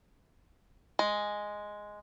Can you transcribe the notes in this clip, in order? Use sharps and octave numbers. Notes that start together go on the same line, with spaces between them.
G#3